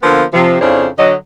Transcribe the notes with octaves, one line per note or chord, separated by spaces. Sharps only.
D3 F3 A#3 B3
C3 F3
F2 C#3 D4 E4 C5 C#5
D3 F#3 D#5